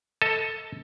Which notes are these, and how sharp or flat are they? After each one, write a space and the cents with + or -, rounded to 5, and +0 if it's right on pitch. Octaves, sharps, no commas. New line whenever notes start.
A4 +10 D#5 +30 A5 +0